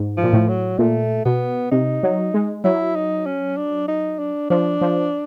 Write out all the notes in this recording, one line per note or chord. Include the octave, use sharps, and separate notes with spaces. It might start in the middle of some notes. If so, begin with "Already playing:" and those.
Already playing: G#2
F3
A#2
A2
F#3
A#2 A3
B2 B3
C3 D#4
F#3
G#3
F#3 E4
D#4
C#4
D4
D#4
D4
F3 D4
F3